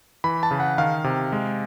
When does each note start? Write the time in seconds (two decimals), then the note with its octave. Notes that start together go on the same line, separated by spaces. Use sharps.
0.24 E3 B5
0.43 A5
0.51 C#3
0.60 F#5
0.78 D#3 F5
1.04 C3
1.32 G#3